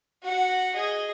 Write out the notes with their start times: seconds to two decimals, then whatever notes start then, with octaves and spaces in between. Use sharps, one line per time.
0.23 F#4 F#5
0.75 G#4 D#5